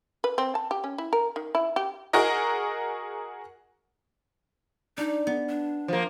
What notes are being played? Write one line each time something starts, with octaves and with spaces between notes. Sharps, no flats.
B4
C4
A5
G4
C#4
E4
A#4
D#3
E4
G4
F#4 G#4 A#4 D#5
D4 D#4
B3
D4
F3 A#3